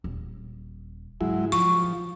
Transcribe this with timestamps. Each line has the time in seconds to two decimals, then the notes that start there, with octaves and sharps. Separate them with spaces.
0.04 D#1
1.21 G#2 C#3 F#3 G#3 E4
1.52 F3 F#3 C#6
1.83 A#1